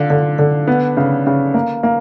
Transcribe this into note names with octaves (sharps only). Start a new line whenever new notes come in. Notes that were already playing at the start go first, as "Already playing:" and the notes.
Already playing: D3 F4
D3
D3
B3
C#3
C#3
A#3
A#3